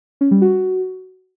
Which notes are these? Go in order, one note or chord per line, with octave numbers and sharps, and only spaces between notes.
C#4
G3
F#4